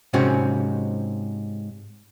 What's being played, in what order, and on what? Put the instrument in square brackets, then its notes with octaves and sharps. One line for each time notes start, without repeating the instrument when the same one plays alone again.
[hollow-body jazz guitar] G#2 C3 C4 C#4 F#4